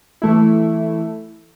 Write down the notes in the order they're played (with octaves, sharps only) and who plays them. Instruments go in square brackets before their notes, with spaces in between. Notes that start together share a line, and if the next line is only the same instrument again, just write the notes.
[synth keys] E3 A3 E4